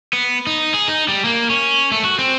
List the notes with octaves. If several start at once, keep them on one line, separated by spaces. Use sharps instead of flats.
B3
D#4
G#4
D#4
G3
A#3
C#4
A3
F#4
C4